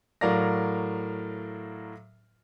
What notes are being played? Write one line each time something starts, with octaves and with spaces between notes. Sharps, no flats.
A2 F#3 A#4 D5 F5 A#6